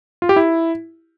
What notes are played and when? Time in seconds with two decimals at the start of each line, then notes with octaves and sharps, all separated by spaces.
0.22 F4
0.29 G4
0.36 E4